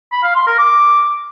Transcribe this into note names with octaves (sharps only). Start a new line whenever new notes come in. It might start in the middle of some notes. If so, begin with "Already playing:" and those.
B5
F5
C6
A#4
D6